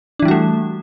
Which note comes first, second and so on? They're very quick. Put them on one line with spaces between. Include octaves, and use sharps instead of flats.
D4 E3 G3 F#4 A3